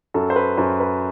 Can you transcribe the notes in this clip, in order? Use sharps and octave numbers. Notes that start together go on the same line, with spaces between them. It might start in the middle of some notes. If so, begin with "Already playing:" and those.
F#2 A4
C5
B4
F#2 C5
B4